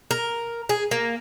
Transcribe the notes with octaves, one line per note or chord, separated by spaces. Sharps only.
A#4
G#4
A#3